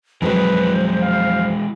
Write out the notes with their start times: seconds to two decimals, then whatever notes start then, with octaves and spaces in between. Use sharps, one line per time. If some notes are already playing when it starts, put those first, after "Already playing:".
0.22 F2 E3 F#3 G#3 B4 C5
1.02 F5